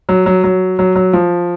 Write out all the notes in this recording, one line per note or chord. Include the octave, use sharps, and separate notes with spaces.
F#3
F#3
F#3
F#3
F#3
F3